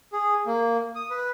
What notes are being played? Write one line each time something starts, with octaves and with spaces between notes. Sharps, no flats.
G#4
A#3
D#6
B4